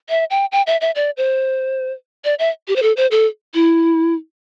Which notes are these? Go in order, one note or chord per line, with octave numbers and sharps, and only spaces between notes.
E5
G5
G5
E5
E5
D5
C5
D5
E5
G4
C5
A4
C5
A4
E4